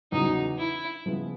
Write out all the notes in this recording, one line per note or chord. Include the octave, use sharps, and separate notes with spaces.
E2 C#3 F#3 D#4
E4
C#3 F3 G#3 B3 E4